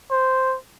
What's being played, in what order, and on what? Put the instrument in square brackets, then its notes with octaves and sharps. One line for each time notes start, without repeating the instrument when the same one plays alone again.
[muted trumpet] C5